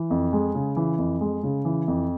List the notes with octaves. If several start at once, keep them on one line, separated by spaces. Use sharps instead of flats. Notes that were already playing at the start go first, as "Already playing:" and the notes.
Already playing: E3
F2
G#3
C#3
E3
F2
G#3
C#3
E3
F2